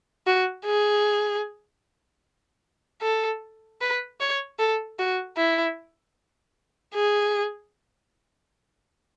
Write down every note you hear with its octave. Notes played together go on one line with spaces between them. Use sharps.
F#4
G#4
A4
B4
C#5
A4
F#4
E4
G#4